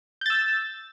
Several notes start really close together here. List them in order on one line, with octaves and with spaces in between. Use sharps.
G6 A6 E6